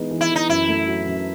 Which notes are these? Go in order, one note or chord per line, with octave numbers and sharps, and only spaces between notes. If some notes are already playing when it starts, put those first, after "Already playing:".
Already playing: E3 G#3 B3 D#4
E3
E4
E3
D#4
F#2 E4
A3
F#3
F#2